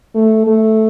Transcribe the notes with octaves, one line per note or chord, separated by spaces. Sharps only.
A3
A3